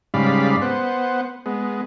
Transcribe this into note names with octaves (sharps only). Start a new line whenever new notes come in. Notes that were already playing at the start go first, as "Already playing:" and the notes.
G#2 C#3 G3 D5 F5 B5
B3 C5 F#5
G#3 B3